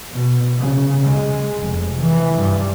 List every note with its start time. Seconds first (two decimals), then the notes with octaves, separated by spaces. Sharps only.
0.12 B2
0.59 C#3
1.07 G#3
1.58 F1
2.01 E3
2.38 G2